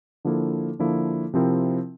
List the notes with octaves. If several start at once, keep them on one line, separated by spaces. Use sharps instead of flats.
D3 F3 A#3 E4 A4
D3 F3 A#3 E4 A4
C3 F3 C4 E4 A#4